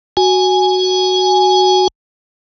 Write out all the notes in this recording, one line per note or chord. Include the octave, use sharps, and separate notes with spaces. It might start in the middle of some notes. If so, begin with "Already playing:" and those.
F#4 G#5